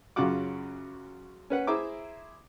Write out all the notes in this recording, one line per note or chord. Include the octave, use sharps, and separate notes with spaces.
F#2 C#3 F4 F#4 F#5 D6
C#4 B4 F#5
E4 G#4 C5 E5 A#5 D6